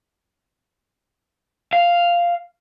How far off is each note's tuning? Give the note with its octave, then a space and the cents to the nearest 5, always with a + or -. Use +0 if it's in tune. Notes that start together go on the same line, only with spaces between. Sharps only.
F5 -5